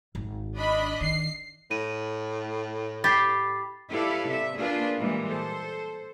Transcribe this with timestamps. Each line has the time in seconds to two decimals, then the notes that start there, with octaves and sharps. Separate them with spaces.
0.15 G#1
0.56 D4 D#5 B5
1.01 D#3 C7
1.71 A2 D#7
3.04 G4 B5 A6 B6 C7
3.90 E4 G4 A4 B4 D5 F5
4.28 C3 E5
4.58 A#3 D4 F4 G#4 B4
4.98 A#2 E3 G3 G#3
5.28 A4 C5